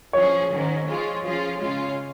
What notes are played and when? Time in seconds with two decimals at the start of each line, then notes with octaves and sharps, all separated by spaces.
0.13 F3 C#4 G#4 C#5
0.51 G#2 D#3 C#4
0.87 F3 G#3 F4 G#4
1.23 F3 C#4 F4 G#4
1.60 C#3 G#3 C#4 F4